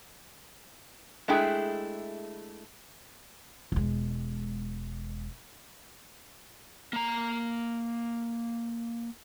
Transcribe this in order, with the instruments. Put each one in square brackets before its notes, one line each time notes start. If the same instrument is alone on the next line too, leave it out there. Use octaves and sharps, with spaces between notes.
[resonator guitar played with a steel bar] G#3 A3 D4 E4 G#4 G5
[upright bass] E1 G#3
[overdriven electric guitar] A#3 A#5